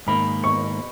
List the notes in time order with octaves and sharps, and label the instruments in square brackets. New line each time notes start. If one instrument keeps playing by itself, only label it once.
[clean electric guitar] G#2 D#3 A#3 [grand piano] B5
[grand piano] C#6